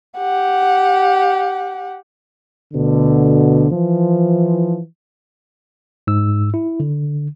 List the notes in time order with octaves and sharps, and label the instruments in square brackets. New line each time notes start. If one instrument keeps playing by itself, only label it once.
[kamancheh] G4 F#5
[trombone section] D2 B2 D3
E3 F3
[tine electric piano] G#2 E6
E4
D3